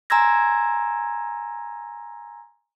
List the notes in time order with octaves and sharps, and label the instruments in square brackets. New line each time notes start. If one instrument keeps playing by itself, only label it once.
[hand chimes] G#5 A#5 C6 E6 G#6 A#6